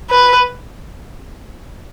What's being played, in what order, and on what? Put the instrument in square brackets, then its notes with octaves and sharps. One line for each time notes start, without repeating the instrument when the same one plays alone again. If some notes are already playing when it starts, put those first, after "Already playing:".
[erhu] B4